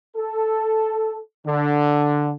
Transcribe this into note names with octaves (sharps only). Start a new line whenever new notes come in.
A4
D3